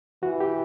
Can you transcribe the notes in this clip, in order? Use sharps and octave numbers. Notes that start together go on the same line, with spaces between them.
E3 F#4
G4